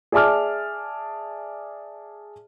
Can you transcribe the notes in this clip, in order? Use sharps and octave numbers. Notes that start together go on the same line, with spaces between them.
G#4 D5 E5 A5 D6 F6